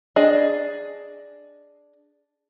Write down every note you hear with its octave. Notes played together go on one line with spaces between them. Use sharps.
D4 G#4 D#5